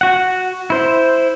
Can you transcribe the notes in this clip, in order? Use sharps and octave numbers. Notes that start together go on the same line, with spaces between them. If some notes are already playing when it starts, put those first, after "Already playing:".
F#4 F#5
E4 C5